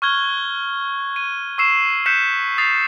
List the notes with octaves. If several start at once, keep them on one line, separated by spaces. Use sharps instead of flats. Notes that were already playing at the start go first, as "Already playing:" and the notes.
C#6 F6 F#6 G#6 G7
D#7
C#6 E6 C7 E7
F#6 G6 B6 C#7 E7
D#6 A6 C7